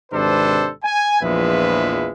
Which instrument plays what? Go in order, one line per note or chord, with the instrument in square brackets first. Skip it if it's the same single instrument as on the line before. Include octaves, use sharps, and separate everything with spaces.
[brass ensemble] G#1 C3 D4 A4 B4 C5
G#5
A#1 E2 F3 G#3 B4 E5